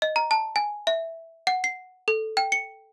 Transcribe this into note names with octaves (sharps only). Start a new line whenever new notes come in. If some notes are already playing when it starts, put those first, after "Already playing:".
D#5
A#5
A5
G#5
E5
F#5
C7
A4
G5
C#7